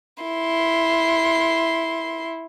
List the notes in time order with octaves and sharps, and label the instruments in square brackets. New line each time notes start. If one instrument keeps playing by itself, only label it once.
[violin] E4 C6